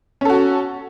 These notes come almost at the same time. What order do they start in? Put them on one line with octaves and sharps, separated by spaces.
C#4 A4 F#4